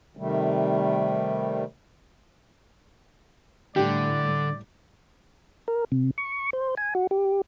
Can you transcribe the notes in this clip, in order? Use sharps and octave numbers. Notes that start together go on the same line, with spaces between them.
C3 D#3 G3 A3
A2 D3 G3 G4 D5
A#4
C3
C#6
C5
G#5
F#4
G4